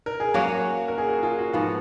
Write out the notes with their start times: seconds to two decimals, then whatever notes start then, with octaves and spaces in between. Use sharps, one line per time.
0.06 A#4
0.20 G#4
0.34 F#3 A#3 C#4 F#4
0.88 A#4
0.98 G#4
1.09 F#4
1.23 F4 G#4
1.39 F#4
1.53 G#2 F3 B3 F4 F#4